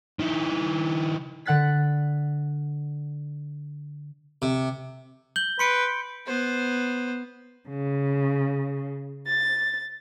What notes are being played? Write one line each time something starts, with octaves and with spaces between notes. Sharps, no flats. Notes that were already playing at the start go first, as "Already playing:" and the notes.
D#3 E4
D3 F#5 F#6 A6 B6
C3
G6 F#7 G7
B4 C6 C#7 D7
B3 C5
C#3
A6